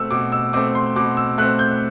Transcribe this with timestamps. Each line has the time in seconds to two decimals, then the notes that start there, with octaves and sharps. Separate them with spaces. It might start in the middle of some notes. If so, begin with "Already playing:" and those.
Already playing: B2 A3 C4 E6
0.11 B2 D6
0.32 E6
0.53 A3 C4 D6
0.75 C6
0.96 B2 D6
1.17 E6
1.38 A3 C4 F#6
1.59 G6